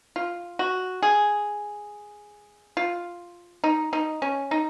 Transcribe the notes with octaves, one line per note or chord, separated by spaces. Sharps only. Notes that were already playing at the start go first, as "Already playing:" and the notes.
F4
F#4
G#4
F4
D#4
D#4
C#4
D#4